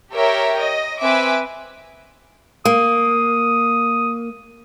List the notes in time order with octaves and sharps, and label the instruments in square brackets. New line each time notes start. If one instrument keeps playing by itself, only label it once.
[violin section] G4 A#4 C#5 E5 G5
D#5
C4 B4 E5 G#5 D6
[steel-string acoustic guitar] A#3 [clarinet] D#6